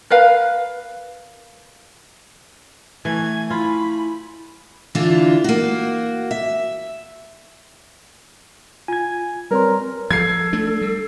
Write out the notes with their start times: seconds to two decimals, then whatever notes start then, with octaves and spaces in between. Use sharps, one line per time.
0.10 A#4 B4 F5
3.05 E3 A3 G#5 G#6
3.50 E4 F4 B5
4.95 D3 E3 D4 F4
5.44 A#3 F#4
6.31 E5
8.88 F4 G#5 G#6
9.51 G3 C4 A#4 B4 C#5 C6
10.11 F3 A4 G#6 C7
10.53 A3 D4
10.82 G3